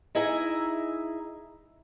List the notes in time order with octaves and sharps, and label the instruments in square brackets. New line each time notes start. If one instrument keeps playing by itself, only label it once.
[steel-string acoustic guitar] D#4 E4 G#4 E5 G#5 A#5